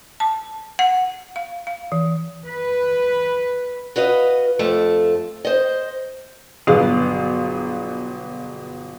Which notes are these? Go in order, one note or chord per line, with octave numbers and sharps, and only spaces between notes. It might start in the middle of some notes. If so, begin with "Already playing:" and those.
A5
F#5
F5
F5
E3
B4
F#4 B4 D#5 F5
F2 A3 A5
C5 D#5
G1 B2 F#3 B3 G#4 F5